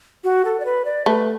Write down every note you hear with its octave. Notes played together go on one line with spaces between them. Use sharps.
F#4
A4
D5
B4
D5
A3 B4